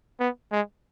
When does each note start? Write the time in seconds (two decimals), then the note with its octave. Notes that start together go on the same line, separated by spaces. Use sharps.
0.20 B3
0.52 G#3